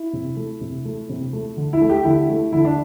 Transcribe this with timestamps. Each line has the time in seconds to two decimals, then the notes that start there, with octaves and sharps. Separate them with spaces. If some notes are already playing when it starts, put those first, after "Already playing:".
Already playing: E4
0.13 C3
0.37 A3
0.61 C3
0.85 A3
1.09 C3
1.33 A3
1.57 D3
1.73 E4
1.81 A3
1.90 G4
2.05 D3 E4
2.29 A3
2.53 D3 E4
2.65 D4